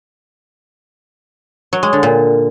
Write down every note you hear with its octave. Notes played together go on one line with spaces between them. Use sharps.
F#3
G#3
D3
A#2